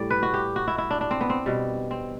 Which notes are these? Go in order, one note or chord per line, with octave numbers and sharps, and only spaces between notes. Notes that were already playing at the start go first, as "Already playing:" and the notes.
Already playing: A2 G3 D5
B4
F#4
G4
F#4
E4
E4
D4
D4
C4
B3
C4
B2 G3
C4